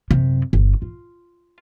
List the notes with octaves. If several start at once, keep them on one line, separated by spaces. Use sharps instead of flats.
F#2 C3
G1
F4